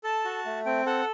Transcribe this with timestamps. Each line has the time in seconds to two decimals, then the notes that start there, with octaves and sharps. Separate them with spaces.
0.04 A4 A5
0.25 F#4
0.45 A3
0.66 C4 G5
0.86 A4 F#5